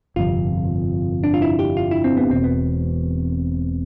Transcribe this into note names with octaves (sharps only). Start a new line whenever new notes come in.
G1 F2 C3 F4
D4
F4
E4
G4
F4
E4
C4
B3
E1 E2 B2 C4
B3